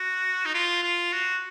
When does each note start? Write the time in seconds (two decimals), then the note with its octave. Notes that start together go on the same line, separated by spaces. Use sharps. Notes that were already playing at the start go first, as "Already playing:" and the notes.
Already playing: F#4
0.46 D#4
0.54 F4
0.84 F4
1.12 F#4